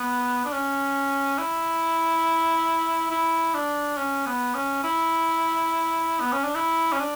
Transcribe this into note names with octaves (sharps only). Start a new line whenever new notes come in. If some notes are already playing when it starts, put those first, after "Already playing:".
Already playing: B3
D4
C#4
E4
E4
D4
C#4
B3
C#4
E4
B3
C#4
D4
E4
C#4
D4